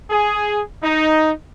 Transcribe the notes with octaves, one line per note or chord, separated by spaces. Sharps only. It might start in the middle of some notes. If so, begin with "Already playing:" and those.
G#4
D#4